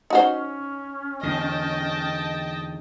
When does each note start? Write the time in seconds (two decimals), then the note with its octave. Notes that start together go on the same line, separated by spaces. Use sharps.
0.10 C#4 D#4 F#4 C5
1.23 E2 D3 D#5 G5 A5